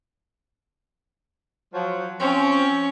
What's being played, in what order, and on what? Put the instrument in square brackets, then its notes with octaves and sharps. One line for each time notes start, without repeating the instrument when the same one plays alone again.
[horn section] F3 F#3
[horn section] F3 C4 [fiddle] C#4